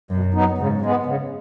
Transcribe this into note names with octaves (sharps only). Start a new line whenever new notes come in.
F#2 B2
F#3 B3 D#4
G#2 C#3
G#3 B3
C#3